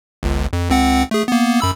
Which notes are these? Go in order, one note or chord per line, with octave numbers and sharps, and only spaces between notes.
G1 C#2
F2
C#2 C4 F#5
A3 G#4
A#3 B3
F#2 B5 E6